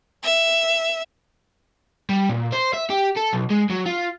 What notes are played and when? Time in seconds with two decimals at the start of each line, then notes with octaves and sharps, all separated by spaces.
0.23 E5
2.09 G3
2.29 A#2
2.52 C5
2.74 E5
2.90 G4
3.17 A4
3.33 B1
3.51 G#3
3.70 F#3
3.86 F4